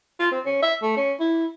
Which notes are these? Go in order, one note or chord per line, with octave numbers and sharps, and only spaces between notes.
F4
C4
C#4
E5
A3
C#4
E4